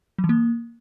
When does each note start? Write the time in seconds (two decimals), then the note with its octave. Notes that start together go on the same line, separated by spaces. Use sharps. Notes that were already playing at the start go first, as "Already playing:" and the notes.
0.19 F#3
0.24 E3
0.29 A#3